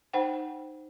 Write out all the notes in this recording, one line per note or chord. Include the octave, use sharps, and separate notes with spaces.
D#4 C5 F#5 G5